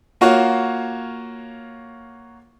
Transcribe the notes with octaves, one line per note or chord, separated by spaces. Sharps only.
A#3 F4 F#4 C#5